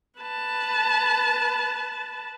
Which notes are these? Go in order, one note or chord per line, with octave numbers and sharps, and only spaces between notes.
B4 A5